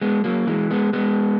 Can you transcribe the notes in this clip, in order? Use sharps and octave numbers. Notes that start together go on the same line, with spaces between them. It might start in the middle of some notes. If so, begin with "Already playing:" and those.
G#3 B3
F#3 A#3
E3 G#3
G#3 B3
G#3 B3